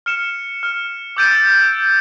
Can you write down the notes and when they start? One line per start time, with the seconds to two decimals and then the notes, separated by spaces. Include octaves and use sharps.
0.06 F6 C#7 E7
0.63 F6
1.17 D6 E6 G6 A6 D7 D#7